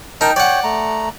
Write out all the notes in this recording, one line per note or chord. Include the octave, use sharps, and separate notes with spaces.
D#4 A#4 G5 A5
C#5 D5 F#5 G5
A3 A#5